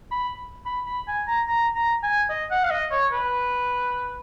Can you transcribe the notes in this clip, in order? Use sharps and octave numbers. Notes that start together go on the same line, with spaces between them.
B5
B5
B5
G#5
A#5
A#5
A#5
G#5
D#5
F#5
F5
D#5
C#5
B4